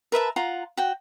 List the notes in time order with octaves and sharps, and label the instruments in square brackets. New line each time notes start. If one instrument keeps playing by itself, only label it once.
[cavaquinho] A#4 B4 E5 A5
F4 F#5 A#5
F#4 G5